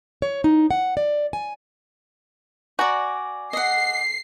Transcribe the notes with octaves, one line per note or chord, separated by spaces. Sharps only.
C#5
D#4
F#5
D5
G#5
F#4 D5 G#5 A#5 D6
D#5 F#5 C7